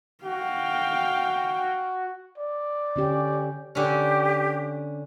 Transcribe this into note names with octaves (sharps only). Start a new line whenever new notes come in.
F#4 F5 G5
D5
D3 C#4 G4
D3 C#4 G4